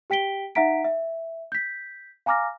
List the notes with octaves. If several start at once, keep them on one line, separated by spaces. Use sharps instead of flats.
G4 G5 B6 D7 G7
D#4 E5 F#5 A#5 B6 D7
E5
G6 B6
F5 G#5 A#5 D6 F6 A#6